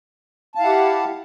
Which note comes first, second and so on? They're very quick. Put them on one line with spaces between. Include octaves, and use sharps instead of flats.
A5 F5 E4 F#5 G4